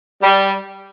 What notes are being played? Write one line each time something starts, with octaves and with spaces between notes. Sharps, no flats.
G3